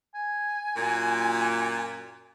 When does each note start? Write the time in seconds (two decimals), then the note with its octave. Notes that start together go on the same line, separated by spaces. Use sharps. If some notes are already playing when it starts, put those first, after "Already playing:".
0.15 G#5
0.77 F#2 A#2